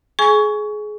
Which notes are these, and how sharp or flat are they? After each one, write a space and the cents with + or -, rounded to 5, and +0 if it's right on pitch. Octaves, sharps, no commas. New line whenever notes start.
G#4 +25 G#5 +0 C#6 +20